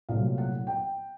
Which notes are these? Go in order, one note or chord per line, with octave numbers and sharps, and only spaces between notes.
C2 A#2 F#3 A3 F5
F#5
G5